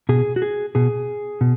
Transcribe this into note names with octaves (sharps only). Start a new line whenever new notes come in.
B2 G#4
F#4
G#4
B2 G#4
B2